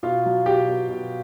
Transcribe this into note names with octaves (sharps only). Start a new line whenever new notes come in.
B2 F4 F5
F#3
B2 G4 G5
B2
B2